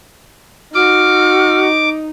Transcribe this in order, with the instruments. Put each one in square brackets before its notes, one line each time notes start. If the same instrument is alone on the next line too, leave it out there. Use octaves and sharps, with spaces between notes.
[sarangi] D#4 [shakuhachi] F#4 [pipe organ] D6 [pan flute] F6